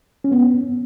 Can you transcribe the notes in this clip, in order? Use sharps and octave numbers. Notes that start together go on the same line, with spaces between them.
C#4
B3